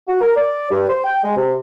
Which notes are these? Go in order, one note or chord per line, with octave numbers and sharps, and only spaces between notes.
F#4
A#4
D5
G2
C5
G5
G#3
C3